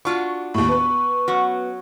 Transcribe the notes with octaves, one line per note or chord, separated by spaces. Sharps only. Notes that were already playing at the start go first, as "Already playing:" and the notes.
D4 F4 F#4 C#6
D#2 A2 C#6
B3 B4
F#3 C#4 F#4